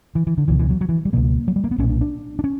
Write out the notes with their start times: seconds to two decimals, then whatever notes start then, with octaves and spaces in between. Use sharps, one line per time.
0.15 E3
0.27 E3
0.38 D3
0.48 C#2 B2 E3
0.59 E3
0.70 F#3
0.81 F#3
0.89 E3
1.05 G3
1.13 C#2 B2 A#3
1.48 F#3
1.56 G3
1.64 A#3
1.71 B3
1.78 B1 A#2 C#4
1.89 D4
2.01 D4
2.39 D4
2.44 C#4